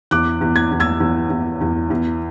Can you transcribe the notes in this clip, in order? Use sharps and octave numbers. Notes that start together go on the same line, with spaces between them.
E2 D6 F#6
E2
G#6
E2
E6 G#6
E2
E2
E2
E2